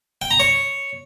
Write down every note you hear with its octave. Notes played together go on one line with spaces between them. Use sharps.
G5
A#5
C#5